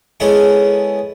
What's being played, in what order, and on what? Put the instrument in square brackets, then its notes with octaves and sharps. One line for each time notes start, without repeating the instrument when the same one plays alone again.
[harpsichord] G#3 B3 C#4 E4 G#4 A4